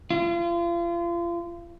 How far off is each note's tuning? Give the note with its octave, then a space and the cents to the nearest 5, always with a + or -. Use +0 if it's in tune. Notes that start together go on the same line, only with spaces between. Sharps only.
F4 -35